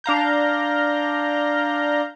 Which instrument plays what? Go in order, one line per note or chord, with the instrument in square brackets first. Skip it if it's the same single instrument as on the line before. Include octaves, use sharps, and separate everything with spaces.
[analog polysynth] D4 F5 A#5 G6